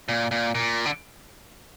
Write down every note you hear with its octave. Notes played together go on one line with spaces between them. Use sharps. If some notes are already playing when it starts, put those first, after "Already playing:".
A#2
A#2
A#2
D3